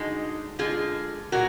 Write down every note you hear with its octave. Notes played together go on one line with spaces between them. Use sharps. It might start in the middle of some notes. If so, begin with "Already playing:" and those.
Already playing: D3 G#3 D#4 F#4
D3 G#3 F4 G#4
A#2 F#3 F#4 A#4